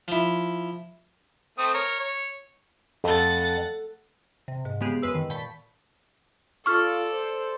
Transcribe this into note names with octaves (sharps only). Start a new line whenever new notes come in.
F3 E4
A3 C4 D#6
A#4 C#5
C#5
F2 A4 F#5 A6
C3
G#2
C#3 G#3 B3 G4 G#4
F#2 G#3 B4 E6 C7
D#3
A#2 G5 A5 B5 C#6 B6
F4 A4 D5 C#6 F6
C5